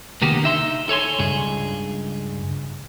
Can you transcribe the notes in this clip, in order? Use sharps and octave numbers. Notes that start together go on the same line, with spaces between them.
C2 D3 D#3 A#3 B3 G4
D#4 E5 C6
A4 C#5 G#5 C6
C#2 G2 G#4